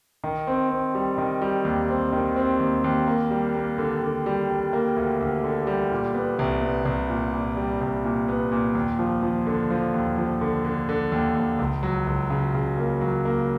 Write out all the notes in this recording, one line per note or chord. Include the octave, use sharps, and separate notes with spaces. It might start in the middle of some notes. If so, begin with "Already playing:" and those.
D#3
C4
C4
G3
D#3
G3
D#2
C4
D#3
C4
D#2
D#2
A#3
G3
A#3
D3
D3
G3
G3
A#3
D2
D2
D3
G3
A#2
B3
C2
B3
C2
A#2
A#2
G3
C2
A#2
B3
A#2
D#2
F3
F3
D3
F3
D#2
F3
D3
D3
D3
D#2
D#2
C#2
F#3
C#2
C#3
C#3
A#3
F#3
A#3